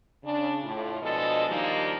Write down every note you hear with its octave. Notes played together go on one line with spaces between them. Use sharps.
C#3 D4
A2 F4
B2 F3 G#3 D4 A4 D#5
D#3 F3 G3 A#3 D4 D#4